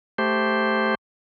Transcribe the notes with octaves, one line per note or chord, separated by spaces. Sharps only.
A3 G4 C5